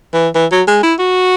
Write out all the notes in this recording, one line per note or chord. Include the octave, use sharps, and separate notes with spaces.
E3
E3
F#3
G#3
E4
F#4